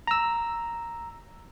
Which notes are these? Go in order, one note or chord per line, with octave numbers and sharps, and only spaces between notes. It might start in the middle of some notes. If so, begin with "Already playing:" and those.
A#5 E6